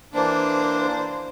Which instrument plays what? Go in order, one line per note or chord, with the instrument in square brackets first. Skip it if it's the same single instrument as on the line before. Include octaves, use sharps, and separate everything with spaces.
[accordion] E3 A#3 D4 [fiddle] C5